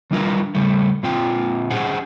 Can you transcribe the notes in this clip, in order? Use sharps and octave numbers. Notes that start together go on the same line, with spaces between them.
D#3 G3 D4 F4 A#4 B4
C#3 G3 A3
A#2 C4 F4 G5
C#4 G4 G#4 C5 F#5